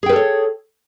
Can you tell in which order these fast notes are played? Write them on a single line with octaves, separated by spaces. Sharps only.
G#4 G5 B4 A4 C#5